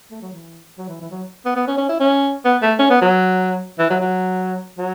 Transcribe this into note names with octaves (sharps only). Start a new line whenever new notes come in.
A3
F#3
E3
F#3
E3
E3
F#3
B3
B3
C#4
C#4
E4
C#4
B3
A3
C#4
B3
F#3
E3
F#3
F#3
F#3